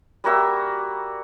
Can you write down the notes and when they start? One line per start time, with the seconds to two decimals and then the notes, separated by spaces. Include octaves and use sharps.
0.24 G3 A#3 F#4 E5